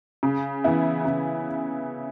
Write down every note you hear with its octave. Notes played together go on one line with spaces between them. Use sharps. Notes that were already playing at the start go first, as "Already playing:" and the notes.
C#3
E3 B3 E4
C#3